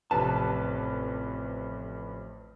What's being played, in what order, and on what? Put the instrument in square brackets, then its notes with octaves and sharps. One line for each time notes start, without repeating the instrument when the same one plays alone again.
[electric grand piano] A1 F2 B4 [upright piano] C3 [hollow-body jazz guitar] A5